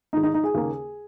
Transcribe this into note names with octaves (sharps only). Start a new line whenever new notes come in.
G#2 D#3 G#3 D#4
D#4
D#4
G#4
D#2 C#3 A#3